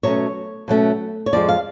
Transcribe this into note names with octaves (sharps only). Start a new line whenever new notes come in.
B2 F#3 A3 C#4 C#5
B2 F#3 A3 C#4
C#5
F2 F3 G#3 D5
F5